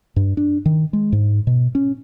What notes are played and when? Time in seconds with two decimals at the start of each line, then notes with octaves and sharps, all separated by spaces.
0.16 G2
0.37 D4
0.66 D#3
0.93 G#3
1.12 G#2
1.47 B2
1.75 C#4